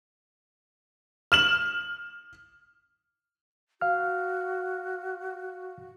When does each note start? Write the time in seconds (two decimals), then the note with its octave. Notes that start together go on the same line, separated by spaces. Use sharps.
1.32 F6 E7 F#7
3.81 F#4 F5 F6